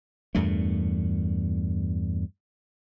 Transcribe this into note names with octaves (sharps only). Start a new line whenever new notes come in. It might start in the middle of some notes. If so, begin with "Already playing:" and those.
E2 G2 A#2 A3